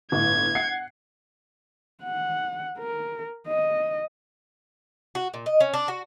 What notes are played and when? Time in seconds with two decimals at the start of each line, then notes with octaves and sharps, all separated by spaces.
0.12 G1 A2 G#6
0.55 F#5 C7 C#7
2.03 F#5
2.78 A#4
3.47 D#5
5.15 F#4
5.34 A#2
5.46 D#5
5.60 C#4
5.74 D4
5.88 F#4